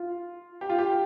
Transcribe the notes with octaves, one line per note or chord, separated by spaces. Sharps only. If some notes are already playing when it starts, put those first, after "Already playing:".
Already playing: F4
G4
F4
G4